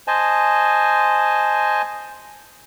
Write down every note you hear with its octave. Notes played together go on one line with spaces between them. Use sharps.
C5 D#5 G#5 A5